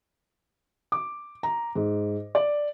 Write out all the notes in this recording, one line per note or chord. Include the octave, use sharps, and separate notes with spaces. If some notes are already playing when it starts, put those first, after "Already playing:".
D6
A#5
G#2
D5